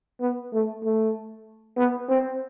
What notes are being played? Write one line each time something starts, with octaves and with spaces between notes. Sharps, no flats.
B3
A3
A3
B3
C4